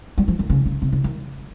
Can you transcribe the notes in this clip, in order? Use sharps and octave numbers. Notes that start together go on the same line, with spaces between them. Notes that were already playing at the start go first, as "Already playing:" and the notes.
G3
F3
D#3
C#3
C#3
C3
C#3
D#3